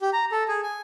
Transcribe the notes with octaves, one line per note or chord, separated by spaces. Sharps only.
G4
A#5
A4
G#4
G#5